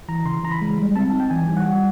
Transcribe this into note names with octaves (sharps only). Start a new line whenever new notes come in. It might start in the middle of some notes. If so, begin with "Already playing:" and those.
E3 A#5
C#3 C6
E3 A#5
B5
G#3
G3
C4 A5
D#4
G5
E3 G#5
G3
F#5
G3